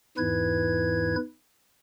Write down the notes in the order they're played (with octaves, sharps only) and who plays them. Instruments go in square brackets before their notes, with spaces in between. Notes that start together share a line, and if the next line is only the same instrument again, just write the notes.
[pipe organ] E2 G#2 E3 E4 B4 G#6